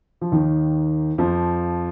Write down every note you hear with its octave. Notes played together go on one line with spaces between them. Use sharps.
F3
D#2 D#3
F2 F3